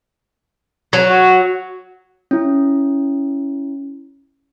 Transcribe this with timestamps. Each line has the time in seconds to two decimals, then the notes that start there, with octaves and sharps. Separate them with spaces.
0.93 F#3
1.09 F#4
2.31 C#4 E4